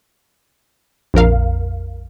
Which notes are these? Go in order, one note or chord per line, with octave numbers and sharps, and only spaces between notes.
A#1 F2 A#4 F5